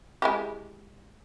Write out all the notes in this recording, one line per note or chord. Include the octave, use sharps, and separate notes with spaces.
G#3 E4 G4